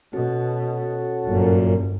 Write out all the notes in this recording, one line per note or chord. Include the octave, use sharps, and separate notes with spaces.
B2 C#4 F#4 A4
G1 F#2 A#2